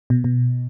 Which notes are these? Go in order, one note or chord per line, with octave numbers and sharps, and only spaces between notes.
B2
B2